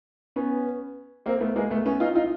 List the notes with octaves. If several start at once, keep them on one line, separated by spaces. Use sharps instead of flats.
B3 C#4
A#3 C4
A3 B3
G#3 A#3
A3 B3
B3 C#4
D#4 F4
D#4 F4